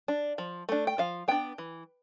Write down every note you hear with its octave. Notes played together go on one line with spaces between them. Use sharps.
D4
F3
A3 D4
G5
F3 F5
B3 D4 G5
E3